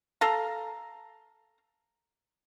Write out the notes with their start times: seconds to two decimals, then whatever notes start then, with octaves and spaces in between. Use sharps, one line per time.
0.21 A4 F5 A#5